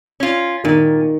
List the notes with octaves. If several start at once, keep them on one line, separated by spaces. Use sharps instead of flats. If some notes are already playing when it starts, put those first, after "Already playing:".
C#4 F4
A#2 D#3